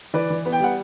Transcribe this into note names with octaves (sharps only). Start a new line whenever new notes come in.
E3 B4 D5
E3
B3
G5
G3 F#5